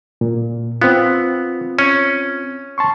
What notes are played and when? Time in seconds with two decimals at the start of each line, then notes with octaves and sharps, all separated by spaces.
0.21 A#2
0.82 B3 C4 F4
1.79 C#4
2.78 A5 C6 C#6